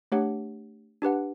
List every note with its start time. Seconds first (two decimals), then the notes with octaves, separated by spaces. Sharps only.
0.12 A3 D4 G4 C#5 F#5
1.02 D4 G4 B4 F#5